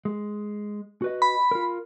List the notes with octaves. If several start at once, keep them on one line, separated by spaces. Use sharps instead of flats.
G#3
F#4 B4 D#5
B5
F4 A#4